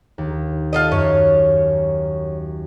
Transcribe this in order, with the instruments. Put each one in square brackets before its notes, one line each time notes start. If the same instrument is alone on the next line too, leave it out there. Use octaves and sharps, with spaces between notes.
[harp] D#2
[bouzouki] F4 A4 D#5
[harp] F#2 [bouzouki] C#5